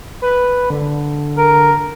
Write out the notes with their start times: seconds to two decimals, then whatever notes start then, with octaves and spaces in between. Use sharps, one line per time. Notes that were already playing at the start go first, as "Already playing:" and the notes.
0.22 B4
0.70 D3
1.37 A#4